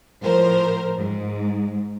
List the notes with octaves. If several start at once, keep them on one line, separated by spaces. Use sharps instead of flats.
A2 F3 A#4 C5
G#2